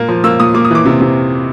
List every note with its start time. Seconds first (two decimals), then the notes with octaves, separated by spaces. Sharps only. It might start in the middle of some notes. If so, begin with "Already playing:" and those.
Already playing: A#2 A#3
0.09 F3
0.24 A#3 E6
0.40 A#2 D#6
0.54 A#3 D6
0.65 D#6
0.71 E3 D6
0.85 C3
1.01 C3